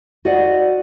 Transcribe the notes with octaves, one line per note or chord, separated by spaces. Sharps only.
F#4 C5 D5 D#5 F5 F#5